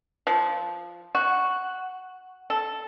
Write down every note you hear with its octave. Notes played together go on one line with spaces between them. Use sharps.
F3
F#4
A4